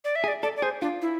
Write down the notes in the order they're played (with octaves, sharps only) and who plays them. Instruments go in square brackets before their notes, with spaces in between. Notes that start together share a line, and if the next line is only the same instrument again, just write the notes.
[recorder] D5
E5
[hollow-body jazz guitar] G#4
[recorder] D5
[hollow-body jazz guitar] A4 [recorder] D5
[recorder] D5
[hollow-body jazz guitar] G#4 [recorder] C5
[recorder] D4 [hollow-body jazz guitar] F4
[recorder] E4